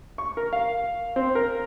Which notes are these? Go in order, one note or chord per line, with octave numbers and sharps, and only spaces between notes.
C#6
A#4
F5
C4
A#4